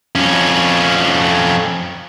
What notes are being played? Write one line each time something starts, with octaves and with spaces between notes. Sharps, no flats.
F2 C#4